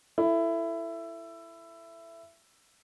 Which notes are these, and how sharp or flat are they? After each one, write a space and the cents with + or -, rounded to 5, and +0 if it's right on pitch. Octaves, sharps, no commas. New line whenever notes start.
E4 +15 A4 +10